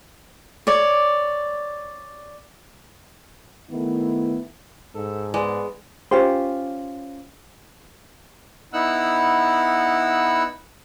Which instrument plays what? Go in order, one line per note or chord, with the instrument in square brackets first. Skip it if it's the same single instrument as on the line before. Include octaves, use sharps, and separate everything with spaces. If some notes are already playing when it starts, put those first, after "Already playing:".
[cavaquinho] C#5 D5
[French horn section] D#3 A3 B3 E4
[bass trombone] G#2 [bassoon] A4
[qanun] G#3 [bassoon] B3 [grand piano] D5 G#5
[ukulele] C#4 F4 G4 C5
[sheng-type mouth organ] B3 D#4 E4 F#5 E6 F#6